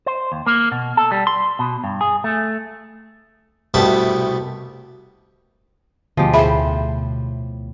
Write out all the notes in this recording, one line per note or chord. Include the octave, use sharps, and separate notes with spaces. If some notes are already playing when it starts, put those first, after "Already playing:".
C5
D#2
A#3
B2
A4
G3
C6
B2
G2
G#4
A3
C2 B2 G3 A3 B4 A5
D2 B2 F3 G#3 G4
A2 G#4 C5 E5 B5